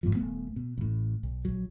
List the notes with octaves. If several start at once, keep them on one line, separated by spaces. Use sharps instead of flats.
G#1 G#2 B2 F3
D#1 G2 A3 B3
B2
A1 A2
B1
A#1 F#3